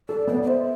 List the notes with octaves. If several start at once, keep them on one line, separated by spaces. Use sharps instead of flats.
A4 D5
B3 D5
D5
C5 E5